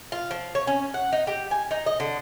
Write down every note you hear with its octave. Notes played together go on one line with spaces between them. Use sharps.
F4
F3
C#5
C#4
F#5
D#4
G4
G#5
D#4
D#5
D3